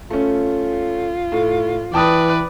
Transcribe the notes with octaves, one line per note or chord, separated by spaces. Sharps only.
A3 C#4 F4
A2
E3 B4 D5 G5 A5 D#6